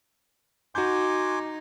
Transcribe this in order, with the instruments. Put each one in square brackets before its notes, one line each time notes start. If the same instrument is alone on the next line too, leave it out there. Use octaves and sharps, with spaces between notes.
[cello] D#4 [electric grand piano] F#4 G6 [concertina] G#5 C6 D6